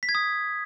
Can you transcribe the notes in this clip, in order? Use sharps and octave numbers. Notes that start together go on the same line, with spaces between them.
B6
G#6
D#6